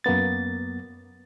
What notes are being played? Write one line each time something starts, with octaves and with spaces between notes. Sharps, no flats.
F#2 A#3 B3 A6